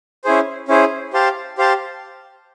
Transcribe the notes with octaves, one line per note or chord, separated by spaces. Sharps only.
C#4 E4 G#4 C5
C#4 E4 G#4 C5
G4 C5 F5 A5
G4 C5 F5 A5